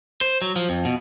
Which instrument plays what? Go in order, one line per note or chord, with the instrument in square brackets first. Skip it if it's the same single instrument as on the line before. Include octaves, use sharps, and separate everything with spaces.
[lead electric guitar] C5
F#3
F3
F2
B2